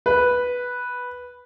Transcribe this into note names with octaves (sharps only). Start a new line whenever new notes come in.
B4